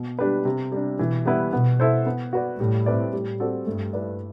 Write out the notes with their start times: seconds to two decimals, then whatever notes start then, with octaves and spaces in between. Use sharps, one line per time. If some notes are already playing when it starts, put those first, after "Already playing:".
Already playing: B2
0.19 G3 D4 G4 B4
0.45 C3
0.72 G3 D4
0.99 B2 E3
1.25 G3 B3 E4 B4
1.53 B2 B3
1.80 E4 A4 C5
2.06 B3
2.33 F#4 B4 D5
2.60 A2 G3
2.86 C4 E4 B4 D5
3.13 G3
3.40 C4 F#4 A4 D5
3.66 G2 A3
3.93 E4 B4 D5